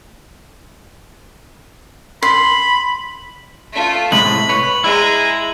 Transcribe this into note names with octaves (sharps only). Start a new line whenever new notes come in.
B5 C6
A3 F4
A2 C3 G#3 B5 F#7
B4 C#5
G#3 E4 A#5